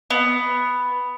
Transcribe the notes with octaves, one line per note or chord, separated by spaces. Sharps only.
B3